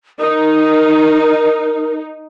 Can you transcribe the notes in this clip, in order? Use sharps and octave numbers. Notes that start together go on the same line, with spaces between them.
D#4 A#4